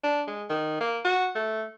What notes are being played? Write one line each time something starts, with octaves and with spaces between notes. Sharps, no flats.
D4
G#3
D#3
A#3
F#4
A3